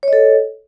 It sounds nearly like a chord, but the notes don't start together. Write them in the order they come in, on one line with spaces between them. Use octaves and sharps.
C#5 D#5 A4